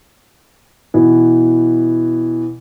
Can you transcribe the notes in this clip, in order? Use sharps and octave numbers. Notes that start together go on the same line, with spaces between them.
B2 E3